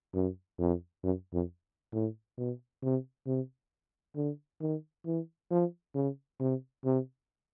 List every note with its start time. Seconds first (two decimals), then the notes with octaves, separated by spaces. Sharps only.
0.14 F#2
0.59 F2
1.04 F#2
1.33 F2
1.93 A2
2.38 B2
2.83 C3
3.27 C3
4.16 D3
4.61 D#3
5.06 E3
5.51 F3
5.95 C#3
6.40 C3
6.85 C3